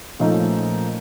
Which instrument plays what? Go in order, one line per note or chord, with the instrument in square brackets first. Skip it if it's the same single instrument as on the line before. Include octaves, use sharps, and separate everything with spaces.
[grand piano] A#2 F3 A3 C#4 D#4